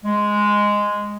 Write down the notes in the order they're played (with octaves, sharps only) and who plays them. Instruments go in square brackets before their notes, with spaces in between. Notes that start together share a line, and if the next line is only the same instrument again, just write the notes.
[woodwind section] G#3